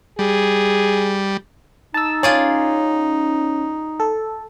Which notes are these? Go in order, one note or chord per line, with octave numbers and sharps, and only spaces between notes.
G3 G#4
D#4 A5 E6
C#4 F4 G#4 D5
A4